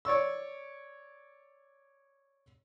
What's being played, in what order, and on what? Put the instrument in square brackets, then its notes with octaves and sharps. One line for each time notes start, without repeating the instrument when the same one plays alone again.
[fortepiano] C#5 D5 C#6 E6